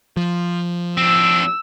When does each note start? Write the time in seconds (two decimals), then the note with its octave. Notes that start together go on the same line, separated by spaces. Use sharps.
0.17 F3
0.97 C4 D4 E6